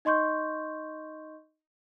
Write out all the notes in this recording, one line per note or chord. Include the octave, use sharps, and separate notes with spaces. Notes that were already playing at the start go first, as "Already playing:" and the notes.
D#4 D#5 C6 C#6 G6